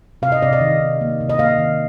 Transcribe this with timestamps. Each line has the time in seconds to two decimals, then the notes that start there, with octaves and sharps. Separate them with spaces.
0.22 C3 F5
0.32 D#5
0.42 C3 D5
0.53 D#5
0.61 D#3
0.81 C3
1.01 A#3
1.20 C3
1.29 D#5
1.39 A#3 F5
1.58 D#3